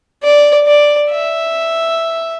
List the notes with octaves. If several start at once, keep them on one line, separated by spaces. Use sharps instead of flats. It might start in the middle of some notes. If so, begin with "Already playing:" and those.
D5
D5
E5